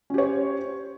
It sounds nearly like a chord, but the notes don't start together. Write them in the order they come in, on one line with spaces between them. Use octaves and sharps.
C#4 G4 C#5 C5